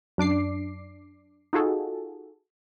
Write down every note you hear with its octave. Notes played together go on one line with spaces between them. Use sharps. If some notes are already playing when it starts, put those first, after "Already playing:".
F#2 D4 D6 C7
D#4 F4 F#4 G#4 A4